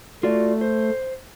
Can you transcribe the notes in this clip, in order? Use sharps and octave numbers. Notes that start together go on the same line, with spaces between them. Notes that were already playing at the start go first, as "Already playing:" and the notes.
A3 F4 F#4 D5
C5